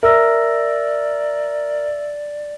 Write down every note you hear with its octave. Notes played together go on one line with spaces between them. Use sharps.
A#4 D5 E5 E6 A#6